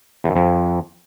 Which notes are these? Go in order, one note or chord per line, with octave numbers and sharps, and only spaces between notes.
E2
F#2
F2